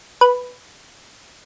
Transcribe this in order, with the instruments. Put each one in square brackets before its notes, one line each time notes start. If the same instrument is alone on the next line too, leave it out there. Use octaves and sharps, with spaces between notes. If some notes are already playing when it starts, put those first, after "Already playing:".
[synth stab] B4